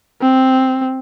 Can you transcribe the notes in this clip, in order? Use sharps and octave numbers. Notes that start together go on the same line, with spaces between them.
C4